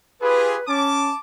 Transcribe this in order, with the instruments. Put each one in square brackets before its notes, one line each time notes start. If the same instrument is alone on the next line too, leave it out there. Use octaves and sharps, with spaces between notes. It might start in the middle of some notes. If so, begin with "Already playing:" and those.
[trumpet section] F4 G4 G#4 [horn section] B4
[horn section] C#4 [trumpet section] A5 D6